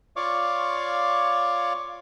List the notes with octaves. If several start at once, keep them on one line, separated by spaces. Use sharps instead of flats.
F4 C#5 D5 F5 C#6 D6